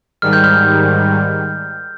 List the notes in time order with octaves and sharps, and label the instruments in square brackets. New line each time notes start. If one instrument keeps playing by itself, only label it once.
[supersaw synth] G#2 D#3 G3 [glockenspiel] F6
[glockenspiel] G6
F6